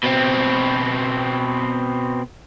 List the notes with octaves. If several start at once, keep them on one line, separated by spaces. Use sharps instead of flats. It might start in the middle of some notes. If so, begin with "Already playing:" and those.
B2 C4